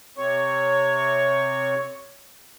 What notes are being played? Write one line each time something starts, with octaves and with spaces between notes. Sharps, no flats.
C3 C4 C#5 C#6